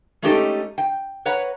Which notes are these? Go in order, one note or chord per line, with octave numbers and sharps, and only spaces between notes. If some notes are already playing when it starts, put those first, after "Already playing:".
G#3 A3 C#4 D#4 G4 A4
G5
B4 C#5 F#5 A#5